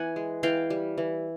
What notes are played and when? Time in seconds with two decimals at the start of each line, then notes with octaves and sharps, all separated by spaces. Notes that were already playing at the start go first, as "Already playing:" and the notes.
Already playing: E3 B3 F#5 G#5
0.16 G#3
0.43 E3 F5 G5
0.70 G3
0.98 E3